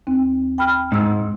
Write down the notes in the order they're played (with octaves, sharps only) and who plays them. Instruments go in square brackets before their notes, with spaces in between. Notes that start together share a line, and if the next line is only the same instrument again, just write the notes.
[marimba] D#2 C4
G5 B5 F6
[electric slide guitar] G#2 [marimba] G#3 E6